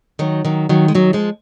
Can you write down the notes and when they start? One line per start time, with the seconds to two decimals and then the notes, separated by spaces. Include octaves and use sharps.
0.19 D#3 F#3
0.45 D#3 F#3
0.69 D#3 F#3
0.88 G#3
0.95 D#3 F#3
1.13 F3 G#3